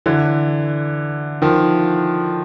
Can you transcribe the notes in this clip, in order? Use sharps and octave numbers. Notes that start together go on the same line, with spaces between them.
D3 E3
D#3 F3